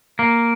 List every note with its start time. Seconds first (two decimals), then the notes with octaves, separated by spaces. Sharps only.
0.19 A#3